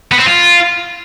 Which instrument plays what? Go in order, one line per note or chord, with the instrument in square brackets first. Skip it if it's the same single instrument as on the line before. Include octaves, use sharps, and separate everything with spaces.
[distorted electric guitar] B3
C4
F4